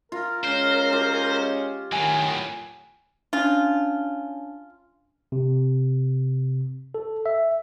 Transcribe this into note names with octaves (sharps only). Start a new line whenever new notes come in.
F4 A#4
G#3 C#4 C5
F4 G4
A2 D#3 F#3 G#5
C#4 D4 F4
C3
A4
E5